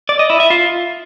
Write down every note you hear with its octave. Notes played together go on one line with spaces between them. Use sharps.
D5
D#5
E4
E5
F4